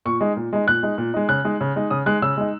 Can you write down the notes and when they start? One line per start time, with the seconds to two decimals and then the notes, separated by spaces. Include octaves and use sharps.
0.05 A#2 C#6
0.21 G#3 D#4
0.36 A#2
0.53 G#3 D#4
0.68 A#2 F#6
0.83 G#3 D#4
0.98 A#2
1.14 G#3 D#4
1.29 C#3 F#6
1.45 G#3 D#4
1.61 C#3
1.76 G#3 D#4
1.90 C#3 D#6
2.06 G#3 D#4 F#6
2.22 C#3 E6
2.37 G#3 D#4